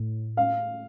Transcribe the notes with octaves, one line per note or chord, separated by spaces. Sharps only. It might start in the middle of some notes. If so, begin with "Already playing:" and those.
Already playing: A2
F5